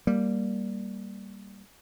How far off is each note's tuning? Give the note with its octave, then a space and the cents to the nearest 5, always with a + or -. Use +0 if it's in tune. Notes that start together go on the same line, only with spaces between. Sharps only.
G3 +0 A#3 +0